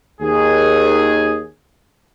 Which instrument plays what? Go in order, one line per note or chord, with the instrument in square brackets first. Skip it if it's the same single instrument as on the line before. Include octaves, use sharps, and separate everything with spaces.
[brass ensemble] D#2 G#4